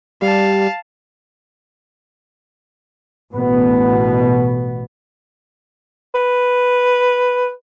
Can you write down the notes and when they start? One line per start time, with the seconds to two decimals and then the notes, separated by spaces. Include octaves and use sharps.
0.22 G3 F5 A5
3.33 A1 B2 B3
6.14 B4